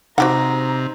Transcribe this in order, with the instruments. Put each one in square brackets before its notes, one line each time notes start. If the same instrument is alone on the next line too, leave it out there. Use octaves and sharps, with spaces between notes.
[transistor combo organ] C3 [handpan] D#4 C5 [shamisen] F#4 G4 F#5 [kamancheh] A#5